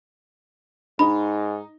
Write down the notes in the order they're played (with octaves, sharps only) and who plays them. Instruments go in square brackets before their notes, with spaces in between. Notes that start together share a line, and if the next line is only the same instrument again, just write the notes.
[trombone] G#2 [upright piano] D#4 [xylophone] B5